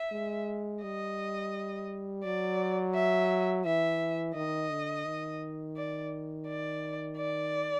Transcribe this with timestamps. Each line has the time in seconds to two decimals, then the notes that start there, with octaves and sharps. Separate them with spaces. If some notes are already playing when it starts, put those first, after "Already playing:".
Already playing: E5
0.12 G#3
0.83 G3 D#5
2.24 F#3 D5
2.95 E5
3.65 E3 E5
4.35 D#3 D#5
4.71 D3
5.06 D#3
5.77 D5
6.47 D5
7.17 D5